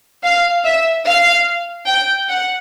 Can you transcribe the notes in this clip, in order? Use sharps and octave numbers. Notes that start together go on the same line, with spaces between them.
F5
E5
F5
G5
F#5